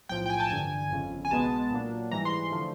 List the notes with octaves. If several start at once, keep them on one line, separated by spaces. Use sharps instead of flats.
B1 A2 F3 G5
G5
G#5
A5
A1 G2 D3 G#5
G1 F2 C#3
G#5
B1 B2 G#3 B3 A5
A#2 F#3 A#3 D4
G#2 E3 G3 A#5
C6
D3 F3 A3